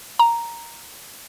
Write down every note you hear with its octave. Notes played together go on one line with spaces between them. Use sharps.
A#5